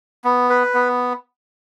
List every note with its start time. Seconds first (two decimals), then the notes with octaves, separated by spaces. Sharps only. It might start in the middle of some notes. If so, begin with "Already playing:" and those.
0.24 B3
0.50 B4
0.74 B3